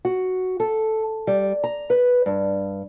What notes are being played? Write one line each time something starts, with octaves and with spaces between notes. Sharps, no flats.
F#4
A4
G3
A#5
B4
G2